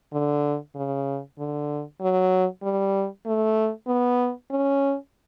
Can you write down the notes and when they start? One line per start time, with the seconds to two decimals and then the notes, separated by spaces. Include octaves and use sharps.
0.13 D3
0.75 C#3
1.38 D3
2.01 F#3
2.63 G3
3.26 A3
3.88 B3
4.51 C#4